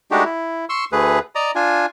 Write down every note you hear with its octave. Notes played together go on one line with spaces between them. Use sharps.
G#3 A3 D4 D#4 F#4 G4
E4
C6 C#6 E6
D2 D3 A3 G#4 B4
D5 D#5 A#5
D4 F4 G#5